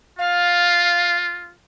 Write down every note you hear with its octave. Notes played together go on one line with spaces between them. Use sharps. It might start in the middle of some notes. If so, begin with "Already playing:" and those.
F4 F5